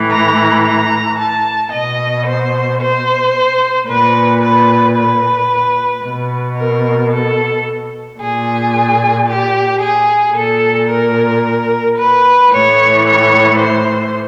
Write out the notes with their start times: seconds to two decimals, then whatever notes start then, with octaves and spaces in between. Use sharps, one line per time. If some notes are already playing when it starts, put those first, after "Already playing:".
Already playing: A2 E3
0.10 A#5
0.64 A#5
1.18 A5
1.72 B2 D#5
2.26 C5
2.80 C5
3.87 A#2 B4
4.41 B4
4.95 B4
6.03 B2
6.57 A#4
7.12 A4
8.19 A#2 G#4
9.27 G4
9.81 G#4
10.35 A#2 A4
10.90 A#4
11.97 B4
12.52 A2 E3 C#5
13.06 C#5
13.58 C5